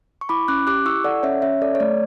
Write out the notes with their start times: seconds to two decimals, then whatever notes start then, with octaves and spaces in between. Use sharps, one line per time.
0.21 C#6
0.29 E4 B5 D6
0.48 C#4 D6 F#6
0.67 G4 D6 F#6
0.85 E4 C#6 E6
1.04 A4 D5 F#5
1.23 C#4 C#5 E5
1.42 C#4 C#5 E5
1.61 A4 D5
1.75 C#5
1.80 A3 D5